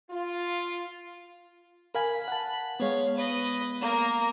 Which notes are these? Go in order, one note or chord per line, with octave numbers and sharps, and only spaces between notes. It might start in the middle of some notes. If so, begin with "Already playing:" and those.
F4
A#4 F5 G#5 B5
F#5 A5
G#3 B3 C#5 F5
B4 D#5
A#3 A#4